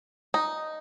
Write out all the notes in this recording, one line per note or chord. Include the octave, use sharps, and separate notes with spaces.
D#4